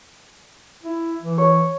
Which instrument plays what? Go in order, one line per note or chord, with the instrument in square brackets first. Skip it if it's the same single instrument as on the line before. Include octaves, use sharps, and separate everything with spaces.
[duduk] E4
E3
[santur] C#5